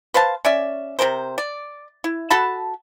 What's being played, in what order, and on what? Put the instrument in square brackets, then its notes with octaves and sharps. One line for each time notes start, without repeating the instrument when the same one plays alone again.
[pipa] B4 C5 F5 A5
C#4 D5 E5
C3 C4 A#4 C5
D5
E4
F#4 A4 A5 B5